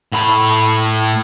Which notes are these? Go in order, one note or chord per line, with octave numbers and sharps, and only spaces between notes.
A2 B5